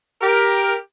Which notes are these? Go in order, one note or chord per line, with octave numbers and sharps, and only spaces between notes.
G4 A#4